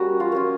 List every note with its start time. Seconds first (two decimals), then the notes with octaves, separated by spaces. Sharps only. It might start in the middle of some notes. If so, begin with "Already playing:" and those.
Already playing: G3 A#3 C#4 F#4
0.20 F4
0.32 A#3 C#4 F4